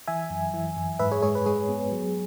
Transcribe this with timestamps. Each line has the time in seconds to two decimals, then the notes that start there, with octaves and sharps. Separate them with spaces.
0.07 E3 E5 G#5
0.30 F#2
0.54 E3
0.77 F#2
0.99 G#2 B4 E5
1.11 G#4 C#5
1.23 G#3 G#4 C#5
1.35 B4
1.46 G#3 G#4
1.69 B3
1.92 F#3